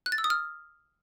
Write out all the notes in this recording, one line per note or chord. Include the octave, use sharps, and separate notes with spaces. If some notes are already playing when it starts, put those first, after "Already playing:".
F#6
A6
E6
D#6
F6